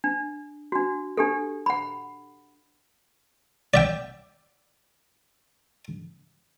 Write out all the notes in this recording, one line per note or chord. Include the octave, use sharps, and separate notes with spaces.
D4
D4 F#4
D4 G4 A4
F#5 B5
D5 E5 G5